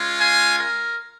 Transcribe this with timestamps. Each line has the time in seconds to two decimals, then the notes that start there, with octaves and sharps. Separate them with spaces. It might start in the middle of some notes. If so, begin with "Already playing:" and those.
Already playing: G#3 C#4 F4
0.19 F5 G#5
0.58 A#4